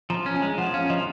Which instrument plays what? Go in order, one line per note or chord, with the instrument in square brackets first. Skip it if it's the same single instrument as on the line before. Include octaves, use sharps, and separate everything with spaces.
[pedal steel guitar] F3 [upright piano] A#5
[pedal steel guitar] C#4
[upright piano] G#5
[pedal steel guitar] G#3
[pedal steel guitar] F3 [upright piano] F#5
[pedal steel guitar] C#4 [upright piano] F5
[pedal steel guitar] F3 [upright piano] D#5